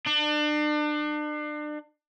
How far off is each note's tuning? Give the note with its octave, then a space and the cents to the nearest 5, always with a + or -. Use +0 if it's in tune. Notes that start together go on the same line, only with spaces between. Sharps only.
D4 +35